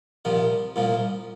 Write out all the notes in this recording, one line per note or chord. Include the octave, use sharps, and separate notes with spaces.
C2 A#2 F3
C2 A#2 F3